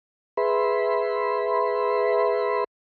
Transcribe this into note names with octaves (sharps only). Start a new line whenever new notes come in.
G#4 B4 E5 B5 C6